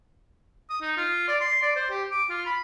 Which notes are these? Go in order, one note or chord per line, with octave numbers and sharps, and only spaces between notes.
D#6
D#4
F4
D5
C6
D5
C5
G4
D6
F4
B5